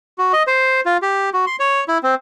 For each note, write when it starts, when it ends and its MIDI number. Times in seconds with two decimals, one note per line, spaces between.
0.18 0.32 66
0.33 0.43 75
0.47 0.81 72
0.85 0.97 65
1.02 1.30 67
1.34 1.45 66
1.47 1.56 84
1.60 1.84 73
1.88 1.98 64
2.03 2.15 60